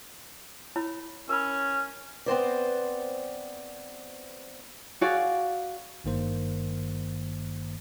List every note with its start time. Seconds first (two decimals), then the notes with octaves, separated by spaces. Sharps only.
0.76 E4 C#5 B5
1.29 C#4 A#4 B5
2.26 B3 C4 C5 D5
5.01 F#4 G#4 D5 F5
6.04 G#1 G2 D#3 A#3 C5